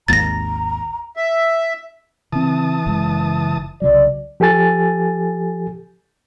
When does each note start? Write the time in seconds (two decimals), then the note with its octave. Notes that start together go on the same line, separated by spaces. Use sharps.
0.08 G#1 D#2 A#5 A6 A#6
1.17 E5
2.32 C#3 E3 C4 A5 D#6
2.86 F#1 C#3 G#3
3.82 C2 C#3 F#3 D5
4.40 F3 G4 A4 G#5 A6